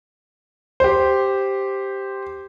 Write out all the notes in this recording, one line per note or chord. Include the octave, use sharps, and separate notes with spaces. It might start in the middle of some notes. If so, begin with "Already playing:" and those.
G4 C5